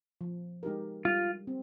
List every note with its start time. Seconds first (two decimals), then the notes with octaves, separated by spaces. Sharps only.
0.21 F3
0.63 G#3 D#4 G4 A#4
1.05 G3 F4
1.47 C4